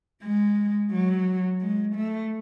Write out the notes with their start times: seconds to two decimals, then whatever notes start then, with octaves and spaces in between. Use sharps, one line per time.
0.23 G#3
0.92 F#3
1.61 G#3
1.95 A3